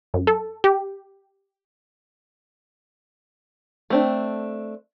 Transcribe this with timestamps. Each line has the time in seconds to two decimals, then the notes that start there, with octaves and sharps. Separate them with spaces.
0.14 F#2
0.27 A4
0.64 G4
3.90 A3 C4 D4